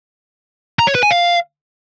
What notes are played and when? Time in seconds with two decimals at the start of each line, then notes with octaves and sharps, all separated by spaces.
0.79 A#5
0.87 C#5
0.95 B4
1.03 G#5
1.11 F5